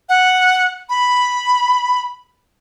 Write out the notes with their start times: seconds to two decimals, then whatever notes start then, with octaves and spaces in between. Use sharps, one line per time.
0.09 F#5
0.89 B5